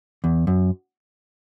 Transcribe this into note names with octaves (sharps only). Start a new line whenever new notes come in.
E2
F#2